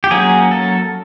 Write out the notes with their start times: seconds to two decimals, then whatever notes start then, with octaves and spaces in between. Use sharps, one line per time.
0.04 G4
0.11 F#3 A#3 C#4 G#4
0.51 A4